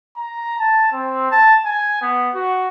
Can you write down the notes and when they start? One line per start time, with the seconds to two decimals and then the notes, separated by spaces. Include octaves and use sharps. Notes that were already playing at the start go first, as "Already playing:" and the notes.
0.16 A#5
0.59 A5
0.92 C4
1.32 A5
1.65 G#5
2.02 B3
2.34 F#4